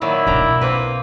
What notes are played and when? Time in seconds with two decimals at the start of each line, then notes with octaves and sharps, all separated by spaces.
0.02 A#2 D#3 F#3 E4
0.27 B1 D3 D4 G5 A#5
0.61 A#3 C4 B4